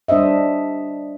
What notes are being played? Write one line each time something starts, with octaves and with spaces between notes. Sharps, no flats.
G3 D4 C5 D#5 E5